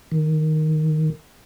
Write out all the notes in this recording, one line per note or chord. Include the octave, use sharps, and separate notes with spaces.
D#3